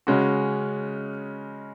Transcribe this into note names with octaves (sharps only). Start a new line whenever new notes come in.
C#3 G#3 C#4 F#4